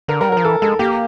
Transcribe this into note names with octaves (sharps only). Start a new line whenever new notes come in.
D3 A#4
G3 A#4
F#3
F3 A#4
E3 A4
G#3 A4
A#3 G4